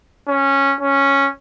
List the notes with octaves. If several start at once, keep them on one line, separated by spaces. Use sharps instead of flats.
C#4
C#4